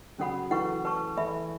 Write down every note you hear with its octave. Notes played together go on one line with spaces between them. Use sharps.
C#3 F#3 C#4 A4 F#5 B5
E3 A3 C#4 E4 B4 F#5 C#6
B4 A5 C#6
E3 A3 A4 E5 B5